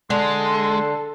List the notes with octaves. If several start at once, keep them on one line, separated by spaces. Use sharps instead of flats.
D3 G#3 A4 C6